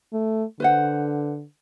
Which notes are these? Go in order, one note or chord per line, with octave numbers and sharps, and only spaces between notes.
A3
D3 B4 C5 F#5